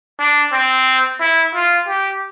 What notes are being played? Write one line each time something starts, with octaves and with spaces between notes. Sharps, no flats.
D4
C4
E4
F4
G4